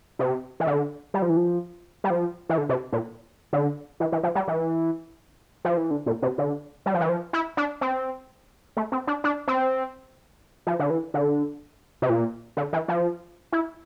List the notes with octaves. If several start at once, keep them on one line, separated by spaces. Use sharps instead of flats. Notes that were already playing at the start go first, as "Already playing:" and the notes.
C3
E3
D3
G3
F3
E3
F3
G3
F3
E3
D3
C3
A#2
D3
E3
E3
F3
G3
E3
F3
E3
D3
A#2
C3
D3
G3
F3
E3
F3
E4
D4
C4
A3
C4
D4
D4
C4
F3
D3
E3
D3
C3
A#2
D3
E3
F3
E4